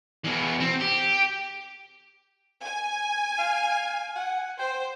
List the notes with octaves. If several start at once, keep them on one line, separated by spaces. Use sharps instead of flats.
E2 B2
C4
G4
G#5
F5
F#5
C5 G5